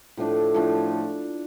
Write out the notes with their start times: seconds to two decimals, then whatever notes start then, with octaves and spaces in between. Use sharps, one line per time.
0.17 A2 F3 A3 D4
0.54 A2 F3 A3 D4